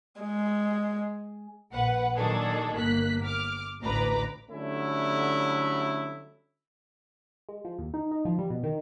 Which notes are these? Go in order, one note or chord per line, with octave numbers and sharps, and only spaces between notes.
G#3
A#1 B4 F#5
A#2 D#3 F#3 D4 G#4 A4
G1 A#3 F#6 B6
D6 F6
A1 D2 B4 A#5 D6
D3 F#3 G3 A3 C#4 E4
G#3
F3
D#2
D#4
D#4
F3
G3
B2
D#3